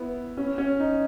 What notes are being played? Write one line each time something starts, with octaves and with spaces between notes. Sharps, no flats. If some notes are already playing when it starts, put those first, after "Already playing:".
Already playing: B3 E4
C#4
C#4
D#4